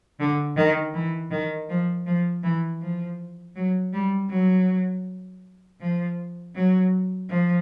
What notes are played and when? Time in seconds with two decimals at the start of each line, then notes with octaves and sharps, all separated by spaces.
0.20 D3
0.57 D#3
0.94 E3
1.31 D#3
1.69 F3
2.06 F3
2.43 E3
2.81 F3
3.55 F#3
3.93 G3
4.30 F#3
5.81 F3
6.55 F#3
7.30 F3